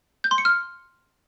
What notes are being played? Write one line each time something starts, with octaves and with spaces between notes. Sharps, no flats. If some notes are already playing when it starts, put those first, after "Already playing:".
G6
C6
C#7
F6